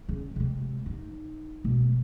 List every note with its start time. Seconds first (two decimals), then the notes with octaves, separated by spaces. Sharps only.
0.09 C#3
0.36 C3 G#3
0.86 D#4
1.64 B2 G#3